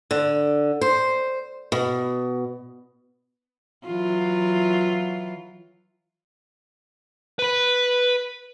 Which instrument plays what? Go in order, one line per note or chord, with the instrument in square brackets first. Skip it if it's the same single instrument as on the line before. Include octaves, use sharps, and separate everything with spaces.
[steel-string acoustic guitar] D3
C5
B2
[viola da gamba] E3 F#3 F4
[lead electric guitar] B4 B5